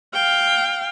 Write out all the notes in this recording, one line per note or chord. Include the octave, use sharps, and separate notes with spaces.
F5 G5